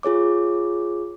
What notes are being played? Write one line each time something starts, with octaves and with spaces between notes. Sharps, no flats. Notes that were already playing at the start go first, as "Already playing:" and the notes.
F4 G#4 C#5 D6